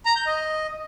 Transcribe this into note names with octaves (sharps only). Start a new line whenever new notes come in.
A#5
G6
D#5